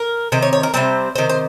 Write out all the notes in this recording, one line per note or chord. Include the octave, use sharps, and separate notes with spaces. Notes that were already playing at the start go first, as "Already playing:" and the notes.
Already playing: A#4
C3 D#3 C5
C#5
C#5
A#4
C3 D#3 G3 C4 C5
C3 D#3 C5
C5